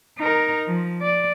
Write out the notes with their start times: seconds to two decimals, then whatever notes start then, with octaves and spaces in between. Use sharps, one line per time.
0.19 D#4 A#4
0.67 F3
1.02 D5